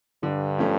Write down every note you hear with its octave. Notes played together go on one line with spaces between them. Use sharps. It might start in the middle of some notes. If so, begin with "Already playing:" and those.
G2 D3
F3 A3 C#4